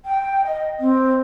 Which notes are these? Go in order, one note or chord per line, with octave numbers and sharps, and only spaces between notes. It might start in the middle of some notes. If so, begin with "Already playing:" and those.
G5
D#5
C4